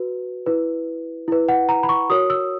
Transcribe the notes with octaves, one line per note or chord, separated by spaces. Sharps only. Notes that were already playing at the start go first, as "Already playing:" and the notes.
Already playing: F#4 B4
E4 B4
E4 B4
F#5
A#5
B5
C#6
F#4 A#4 C#5 D#6
E6